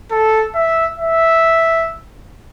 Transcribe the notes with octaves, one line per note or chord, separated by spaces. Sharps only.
A4
E5
E5